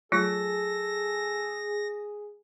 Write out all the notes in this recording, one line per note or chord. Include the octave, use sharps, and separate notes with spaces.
F#3 A3 F4 G#4 A4 A#6